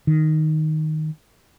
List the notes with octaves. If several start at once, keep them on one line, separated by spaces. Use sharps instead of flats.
D#3